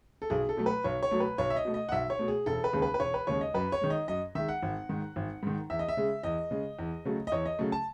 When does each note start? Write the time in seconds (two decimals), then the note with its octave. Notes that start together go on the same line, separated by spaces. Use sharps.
0.22 A4
0.30 B1 G#4
0.49 A4
0.57 B2 F#3 A3
0.66 B4
0.84 B1 C#5
1.03 C#5
1.11 B2 F#3 A3
1.20 B4
1.38 B1 C#5
1.50 E5
1.56 D#5
1.65 B2 A3
1.74 D#5
1.89 F#5
1.92 B1 E5
2.10 C#5
2.19 B2 A3
2.28 G#4
2.46 E1 A4
2.64 B4
2.73 D#2 C#3 G#3
2.82 B4
2.94 B4
3.00 E1 C#5
3.14 B4
3.27 D#2 C#3 G#3 C#5
3.41 D#5
3.54 F#2 B4
3.72 C#5
3.81 D#3 G#3
3.90 D#5
4.08 F#2 D#5
4.35 D#3 G#3 E5
4.48 F#5
4.62 G#1
4.89 G#2 D#3
5.16 G#1
5.43 G#2 D#3
5.70 E2 E5
5.79 D#5
5.89 E5
5.97 C#3 G#3
6.23 E2 D#5
6.51 C#3 G#3
6.79 E2
7.05 C#3 F#3 A3
7.27 D#5
7.32 E2 C#5
7.46 D#5
7.59 C#3 F#3 A3
7.72 A5